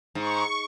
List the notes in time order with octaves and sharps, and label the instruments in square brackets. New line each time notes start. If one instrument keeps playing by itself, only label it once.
[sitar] G#2 [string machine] C#6